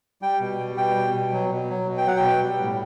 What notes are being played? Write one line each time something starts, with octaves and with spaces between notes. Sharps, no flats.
G3 G5
B2
G3
B2 G5
G3
B2
F#3
B2
F#3
B2
G5
F#3 F#5
G5
B2
G3
A2